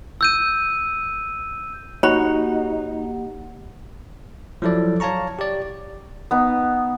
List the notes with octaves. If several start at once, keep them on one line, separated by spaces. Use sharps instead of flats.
E6 G6 D#7
A#3 D#4 F#4 G4 C#5 F#5 B5
F3 F#3 E4 A4 D5
C#5 F5 A5 A#5 C#6
G4 D5
B3 D#4